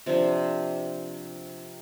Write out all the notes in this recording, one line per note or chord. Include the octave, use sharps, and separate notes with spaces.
C3 F3 D4